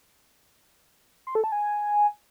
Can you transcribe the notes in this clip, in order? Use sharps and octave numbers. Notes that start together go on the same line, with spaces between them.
C6
A4
A5
G#5